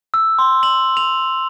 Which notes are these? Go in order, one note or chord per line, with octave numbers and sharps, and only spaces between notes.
E6
C6
F#7
F7